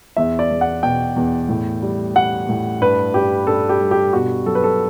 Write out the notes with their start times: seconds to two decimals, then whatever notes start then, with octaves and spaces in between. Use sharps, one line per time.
0.17 E2 E5
0.39 D5
0.51 E2
0.61 F#5
0.83 B2 G5
1.16 E2
1.49 A2
1.82 G3
2.15 G3 F#5
2.49 A2
2.81 G2 B4
3.14 G2 G4
3.47 G2 A4
3.69 G4
3.81 G3
3.91 G4
4.13 B2 F#4
4.46 F#3 A4
4.55 B4
4.64 A4